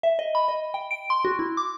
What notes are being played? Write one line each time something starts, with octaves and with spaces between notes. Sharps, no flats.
E5
D#5
B5
D#5
G5
D7
C6
F#4
E4
D6